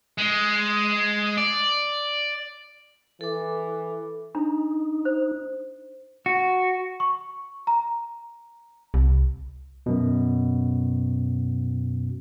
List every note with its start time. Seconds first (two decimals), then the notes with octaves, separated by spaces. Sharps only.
0.18 G#3
1.37 D5
3.21 E3 A4 D6
4.35 D4 D#4
5.05 C5
6.26 F#4
7.00 C#6
7.67 A#5
8.94 C2
9.86 F#2 B2